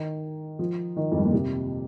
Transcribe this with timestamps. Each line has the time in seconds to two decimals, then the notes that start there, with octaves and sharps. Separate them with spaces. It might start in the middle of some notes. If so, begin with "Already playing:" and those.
Already playing: D#3
0.59 F3
0.97 D#3
1.12 F2
1.18 G2
1.25 A#2
1.33 C3